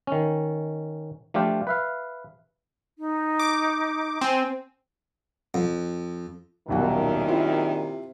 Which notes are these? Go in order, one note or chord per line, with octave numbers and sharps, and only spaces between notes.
D#3 C#4
F3 A3 D4 F4 G4
B4 E5 F5
D#4
D6
C4 G#5
F2
D#1 B1 F#2 A#2 D#3 F#5
C3 E4 F4